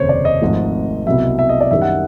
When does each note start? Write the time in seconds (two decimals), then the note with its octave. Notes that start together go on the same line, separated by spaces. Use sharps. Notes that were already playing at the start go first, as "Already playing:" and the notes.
Already playing: F1 D#2 C#3 C5 C#5
0.09 D5
0.25 D#5
0.41 G#1 G#2 F3 A3
1.07 C2 B2 F#3 E5
1.39 E5
1.49 D#5
1.61 D5
1.71 F#2 D#3 G3 E5
1.82 F#5